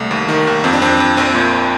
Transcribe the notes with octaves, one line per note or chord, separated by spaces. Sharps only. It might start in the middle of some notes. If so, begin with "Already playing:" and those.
Already playing: C2 A3
D#2
D#3
D#2
F2 C4
D4
F2 C4
F2
A#1 C4
A#2